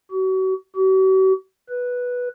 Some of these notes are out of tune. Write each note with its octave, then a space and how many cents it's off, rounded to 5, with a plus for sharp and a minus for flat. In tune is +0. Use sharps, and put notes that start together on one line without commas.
F#4 +35
F#4 +45
B4 -5